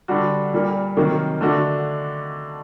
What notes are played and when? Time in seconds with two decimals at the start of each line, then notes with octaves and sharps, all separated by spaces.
0.08 D3 G3 D4 F#4
0.53 A#2 G3 A#3
0.97 C3 D#3 F#3 A#3
1.41 D3 A3 D4 F#4